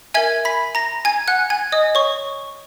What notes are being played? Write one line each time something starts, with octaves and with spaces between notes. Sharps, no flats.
A#4 E5 G#5 G#6
B5 B6
A#5 A#6
G#5 G#6
F#5 F#6
G#5 G#6
D#5 D#6
C#5 C#6